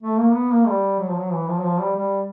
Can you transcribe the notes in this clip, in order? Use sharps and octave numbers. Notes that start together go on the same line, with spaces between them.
A3
A#3
B3
A#3
G3
F#3
F3
F#3
E3
F3
F#3
F3
G3
G3